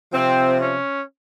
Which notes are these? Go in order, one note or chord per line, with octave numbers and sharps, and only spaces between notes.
C3 F3 C4
C#4